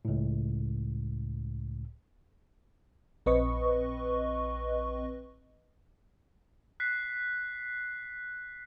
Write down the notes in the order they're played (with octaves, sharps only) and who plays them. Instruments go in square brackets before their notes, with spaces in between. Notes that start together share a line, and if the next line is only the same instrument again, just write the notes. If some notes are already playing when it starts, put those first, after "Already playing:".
[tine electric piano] C#2 A2
[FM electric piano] A#1 C4 B4 D#5 C#6
[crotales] F#6 B6 C7